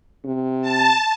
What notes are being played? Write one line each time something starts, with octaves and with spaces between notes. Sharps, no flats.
C3
A5